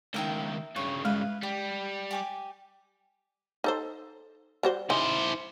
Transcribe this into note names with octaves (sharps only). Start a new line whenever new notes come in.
C#2 D#3 A#4 E5 G5
G2 C#3 C#5
G#3 E4 B4 F5
G3 G4
G4 G#5 D6
D#4 A4 C5
G3 F#4 C5
D#4 E4 G#4 C5